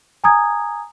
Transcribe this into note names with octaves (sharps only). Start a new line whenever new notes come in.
G#5 A#5 D#6 G#6